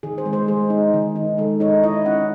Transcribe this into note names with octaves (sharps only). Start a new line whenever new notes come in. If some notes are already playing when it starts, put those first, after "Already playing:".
D#3 G#4
C5
G#3
C5
G#3 G#4
D#4
D#3
D#4
G#3 A4
D#4 C#5
E4 D#5
C#4 F#5